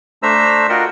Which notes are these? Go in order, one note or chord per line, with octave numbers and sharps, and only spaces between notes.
A3 D4 C5 E5 A#5 E6
F4 F#4 A#4 D#5 F#5 G5